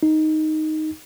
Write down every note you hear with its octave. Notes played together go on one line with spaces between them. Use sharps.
D#4